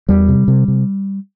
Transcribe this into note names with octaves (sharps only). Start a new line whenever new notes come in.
E2 G3
C3
C3
C3